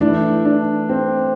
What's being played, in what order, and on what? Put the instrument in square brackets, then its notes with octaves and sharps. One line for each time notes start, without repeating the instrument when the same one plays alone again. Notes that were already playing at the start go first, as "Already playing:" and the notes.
[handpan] E3 A3 E4 [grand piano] D4
[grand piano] D4
C4